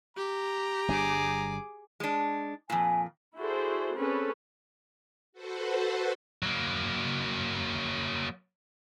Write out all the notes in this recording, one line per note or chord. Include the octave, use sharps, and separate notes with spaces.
G4 A#5
G1 G3 D4 G#4 D6
G#3 D4
F2 A#2 G#5
E4 F#4 G#4 A4 C5 D5
C4 C#4 G#4 A4 B4 C#5
F#4 A4 B4 C5 F#5
F#3 A#3